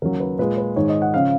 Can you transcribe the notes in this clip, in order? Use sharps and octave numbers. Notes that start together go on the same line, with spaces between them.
D#2 C#3 F#3 A#4
B4
A#2 G#3 B4
B4
G#2 D#3 G#3 C#5
D#5
F#5
C#3 F3 F5